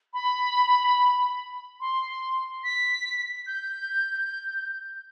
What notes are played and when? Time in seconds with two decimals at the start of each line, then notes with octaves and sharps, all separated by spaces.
0.14 B5
1.80 C6
2.64 B6
3.47 G6